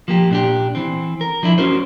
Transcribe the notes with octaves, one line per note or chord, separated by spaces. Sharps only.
F3 A#3 G4
A#2 D4 G4
E3 C4
A#4
F3 D4 E4
C#4 F#4 A#4 C5